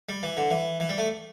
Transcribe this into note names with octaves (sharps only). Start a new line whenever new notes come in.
G3
E3
D3
E3
E3
G3
A3